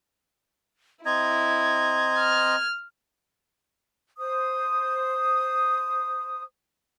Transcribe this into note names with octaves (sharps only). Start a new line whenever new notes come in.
C4 E4 D#5 A#5 G#6
F6
C5 D#6